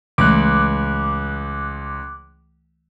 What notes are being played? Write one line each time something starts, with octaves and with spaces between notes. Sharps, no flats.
C#2 E3 A3 D6 F#6